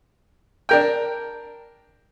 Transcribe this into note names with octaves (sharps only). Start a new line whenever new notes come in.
D4 A#4 G5